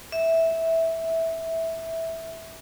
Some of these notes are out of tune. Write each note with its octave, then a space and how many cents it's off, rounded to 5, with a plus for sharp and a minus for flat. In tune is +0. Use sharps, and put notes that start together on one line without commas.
E5 -10